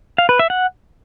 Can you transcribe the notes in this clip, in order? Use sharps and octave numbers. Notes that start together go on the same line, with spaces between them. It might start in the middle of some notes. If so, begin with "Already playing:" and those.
F5
B4
E5
F#5